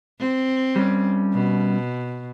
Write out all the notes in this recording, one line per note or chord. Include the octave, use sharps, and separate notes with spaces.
C4
G3 C#4
B2